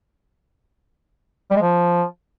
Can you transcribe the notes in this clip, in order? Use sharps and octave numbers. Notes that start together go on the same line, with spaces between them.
G3
G#3
F3